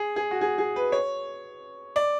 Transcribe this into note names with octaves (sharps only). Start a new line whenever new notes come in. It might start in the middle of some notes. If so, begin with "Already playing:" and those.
Already playing: G#4
G#4
F#4
G#4
G#4
B4
C#5
D5